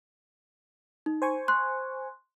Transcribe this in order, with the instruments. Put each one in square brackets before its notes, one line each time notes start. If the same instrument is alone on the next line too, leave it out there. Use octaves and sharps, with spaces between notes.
[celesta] D#4
[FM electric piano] C5 G#5 C#6
[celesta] C6 F#6